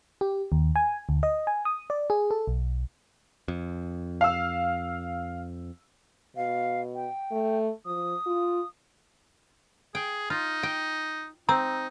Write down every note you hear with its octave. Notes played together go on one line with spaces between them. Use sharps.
G4
D#2
G#5
D2
D#5
G#5
D#6
D5
G#4
A4
B1
F2
F5 E6
B2 F5
G5
A3
F3 D#6
F4
G#4 G5
D#4 F4
G5
C4 D#4 A#5 E6